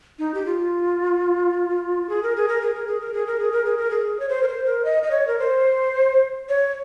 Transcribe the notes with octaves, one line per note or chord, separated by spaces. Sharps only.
D#4
G4
F4
G#4
A#4
G#4
A#4
G#4
A#4
G#4
A#4
G#4
A#4
G#4
A#4
G#4
A#4
G#4
C#5
C5
A#4
C5
A#4
D#5
D#5
C#5
A#4
C5
C#5